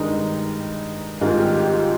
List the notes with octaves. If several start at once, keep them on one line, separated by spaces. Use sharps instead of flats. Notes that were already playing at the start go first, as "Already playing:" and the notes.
Already playing: G2 D#3 G#3 D#4
G#2 D#3 G3 F4
G4
G4
F4